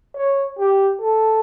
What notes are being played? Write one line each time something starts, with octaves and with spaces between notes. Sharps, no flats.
C#5
G4
A4